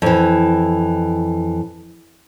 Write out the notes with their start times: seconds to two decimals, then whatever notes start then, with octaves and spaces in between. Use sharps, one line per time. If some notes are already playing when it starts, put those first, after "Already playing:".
0.02 F2 E3